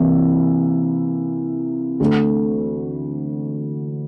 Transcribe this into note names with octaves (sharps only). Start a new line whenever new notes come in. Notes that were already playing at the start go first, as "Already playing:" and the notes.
Already playing: C3 E3 A#3 E4
D2 D3 A3